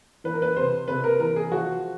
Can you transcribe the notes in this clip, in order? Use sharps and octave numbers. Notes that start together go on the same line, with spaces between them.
E3 B4
A#4
B4
C3 C5
C3 B4
A#4
E3 A#4
G#4
F3 F#4